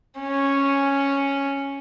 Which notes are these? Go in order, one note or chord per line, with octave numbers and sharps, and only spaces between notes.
C#4